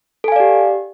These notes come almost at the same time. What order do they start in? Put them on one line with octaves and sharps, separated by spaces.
A4 G#5 F5 D5 G4